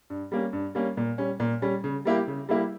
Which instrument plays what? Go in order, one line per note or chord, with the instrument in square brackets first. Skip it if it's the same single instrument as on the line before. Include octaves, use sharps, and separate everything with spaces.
[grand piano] G2
G3 A#3 C#4
G2
G3 A#3 C#4
A#2
G3 C#4
A#2
G3 C#4
C#3
G3 A#3 E4 G4
C#3
G3 A#3 E4 G4